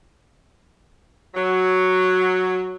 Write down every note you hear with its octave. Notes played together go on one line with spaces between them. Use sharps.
F#3